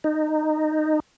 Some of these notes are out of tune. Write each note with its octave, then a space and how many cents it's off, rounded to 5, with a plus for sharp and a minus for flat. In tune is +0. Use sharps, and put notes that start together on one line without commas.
D#4 -15